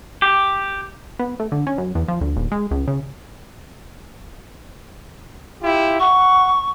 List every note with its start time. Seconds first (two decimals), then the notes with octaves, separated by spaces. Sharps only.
0.22 G4
1.19 B3
1.40 A3
1.52 D3
1.67 C#4
1.78 F#2
1.95 E2
2.08 F3
2.21 D2
2.36 D#1
2.52 G#3
2.71 C#2
2.88 C#3
5.61 E4 F4 G4
6.00 F#5 C#6